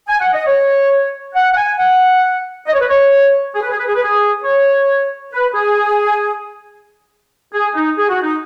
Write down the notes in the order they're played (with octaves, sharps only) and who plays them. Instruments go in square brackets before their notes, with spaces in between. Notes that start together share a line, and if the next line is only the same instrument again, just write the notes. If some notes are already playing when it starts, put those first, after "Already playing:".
[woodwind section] G#5
F#5
D#5
C#5
F#5
F#5
G#5
F#5
D#5
C#5
B4
C#5
G#4
B4
G#4
B4
G#4
B4
G#4
C#5
B4
G#4
G#4
D#4
G#4
F#4
D#4